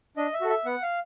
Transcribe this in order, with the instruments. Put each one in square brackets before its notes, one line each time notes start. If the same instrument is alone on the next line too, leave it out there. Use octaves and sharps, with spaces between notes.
[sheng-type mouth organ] D4 D#5
E5
F#4 A4
E5
B3 F#5
F5